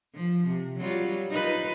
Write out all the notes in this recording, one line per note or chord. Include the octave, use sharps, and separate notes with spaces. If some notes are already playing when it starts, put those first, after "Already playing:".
F3
C3
F#3 G3 F4
D#4 F4 B4